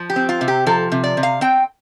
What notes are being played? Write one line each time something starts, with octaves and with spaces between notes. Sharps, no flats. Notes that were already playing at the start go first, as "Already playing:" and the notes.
Already playing: F3
G4
C4
F4
C3
G4
F3 A4
C3
D5
C3
F5
C4 G5